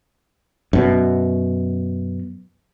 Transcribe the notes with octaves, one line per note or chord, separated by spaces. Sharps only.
F#2 B2